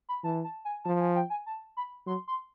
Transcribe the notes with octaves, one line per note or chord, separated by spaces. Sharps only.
B5
E3 A5
A5
G#5
F3 A5
G#5
G5
G#5
A5
B5
F#3 C6
C6